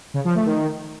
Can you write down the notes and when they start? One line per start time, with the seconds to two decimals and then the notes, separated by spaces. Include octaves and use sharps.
0.14 C#3
0.25 F3
0.35 A3
0.46 D#3